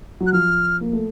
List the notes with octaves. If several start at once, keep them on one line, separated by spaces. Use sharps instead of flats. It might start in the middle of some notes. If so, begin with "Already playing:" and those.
F#3
F#6
F3 F6
A#3
A3